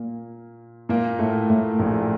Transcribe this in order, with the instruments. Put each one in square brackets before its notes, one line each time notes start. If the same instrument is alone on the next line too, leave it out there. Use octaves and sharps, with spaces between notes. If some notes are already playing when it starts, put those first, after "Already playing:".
Already playing: [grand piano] A#2 A#3
A#2 A#3
A2 A3
A2 A3
A#1 A#2